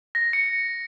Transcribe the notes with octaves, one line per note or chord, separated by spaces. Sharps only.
A#6
C#7